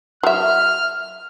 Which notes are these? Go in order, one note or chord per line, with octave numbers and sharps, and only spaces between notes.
F#3 E5 F6